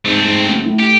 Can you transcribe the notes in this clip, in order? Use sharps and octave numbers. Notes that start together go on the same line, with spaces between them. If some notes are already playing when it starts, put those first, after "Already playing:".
G#2 A3 C4
G#2
F#1
A2
G4